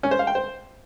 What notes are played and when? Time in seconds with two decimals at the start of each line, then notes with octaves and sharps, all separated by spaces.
0.03 C#4
0.11 C5
0.19 F5
0.27 G5
0.35 C5